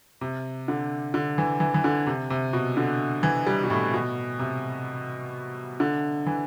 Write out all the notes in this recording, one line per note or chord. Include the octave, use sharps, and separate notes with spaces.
C3
D3
D3
E3
E3
E3
D3
C3
C3
B2
D3
E3
G3
B2
A2
B2
C3
D3
E3